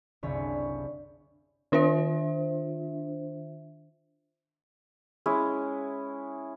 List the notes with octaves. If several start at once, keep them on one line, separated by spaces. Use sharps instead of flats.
F#1 C2 D3 G#4 C#5 B5
D#3 D4 F4 C5 E5
G#3 C#4 E4